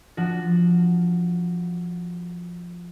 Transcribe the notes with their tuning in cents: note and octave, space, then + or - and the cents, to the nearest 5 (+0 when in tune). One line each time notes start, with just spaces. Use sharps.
F3 +0 D4 +0 F#4 +0